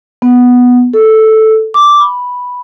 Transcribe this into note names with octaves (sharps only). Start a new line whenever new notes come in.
B3
A4
D6
B5